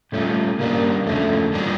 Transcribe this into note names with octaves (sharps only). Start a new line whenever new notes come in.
A#2 G3 A3 C#4 F4
C#3 G3 A#3 D4
E2 D3 F3 A3 A#3 C#4
A2 G3 A#3 D4 F4